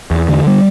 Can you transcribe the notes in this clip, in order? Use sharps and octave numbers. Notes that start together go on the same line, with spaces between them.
E2
D3
G3